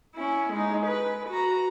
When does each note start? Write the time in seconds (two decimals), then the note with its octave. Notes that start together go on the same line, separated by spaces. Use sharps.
0.15 C#4 E4
0.53 G#3 D#4
0.86 B4
1.29 F#4 A#5